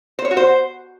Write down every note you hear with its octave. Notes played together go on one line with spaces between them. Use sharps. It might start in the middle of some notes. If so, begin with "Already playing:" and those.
C5
C#5
F#4
C5